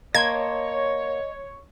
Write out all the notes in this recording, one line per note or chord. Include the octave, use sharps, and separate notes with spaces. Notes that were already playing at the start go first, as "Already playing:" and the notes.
A#3 C#5 D#5 A5 C6 G#6